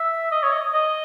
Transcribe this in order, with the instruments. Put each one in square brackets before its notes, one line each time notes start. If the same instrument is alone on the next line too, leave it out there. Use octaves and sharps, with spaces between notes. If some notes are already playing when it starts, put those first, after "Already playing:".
Already playing: [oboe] E5
D#5
C#5
D#5
D#5